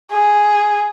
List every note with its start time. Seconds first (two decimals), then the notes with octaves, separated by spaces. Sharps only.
0.12 G#4